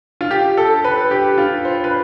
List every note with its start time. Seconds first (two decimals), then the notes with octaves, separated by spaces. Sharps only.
0.21 F4
0.31 G4
0.57 A4
0.84 B4
1.11 G4
1.38 F4
1.65 C5
1.84 B4